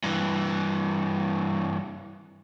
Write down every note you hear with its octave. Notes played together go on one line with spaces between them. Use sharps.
G2 E3